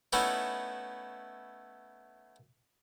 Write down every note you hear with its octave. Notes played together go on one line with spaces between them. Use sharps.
A3 B3 C#4 D#4 E4